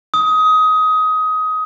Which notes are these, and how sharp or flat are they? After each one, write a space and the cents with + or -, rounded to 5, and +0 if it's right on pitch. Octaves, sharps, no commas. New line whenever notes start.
D#6 +20